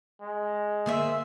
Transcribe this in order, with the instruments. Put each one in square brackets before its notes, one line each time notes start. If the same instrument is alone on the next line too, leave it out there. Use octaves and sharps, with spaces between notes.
[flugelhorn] G#3
[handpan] D3 A#3 [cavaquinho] G#4 C5 E5